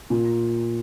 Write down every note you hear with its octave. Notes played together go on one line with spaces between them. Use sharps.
A#2